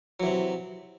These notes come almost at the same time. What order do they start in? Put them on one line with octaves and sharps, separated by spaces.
F#3 E3 C3